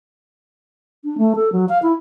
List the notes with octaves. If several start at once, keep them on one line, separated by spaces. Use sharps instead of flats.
D4
A3
A4
F#3
F5
E4